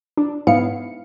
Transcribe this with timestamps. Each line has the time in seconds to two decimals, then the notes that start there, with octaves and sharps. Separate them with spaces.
0.17 D4
0.47 G#2 B3 E4 F5 C#7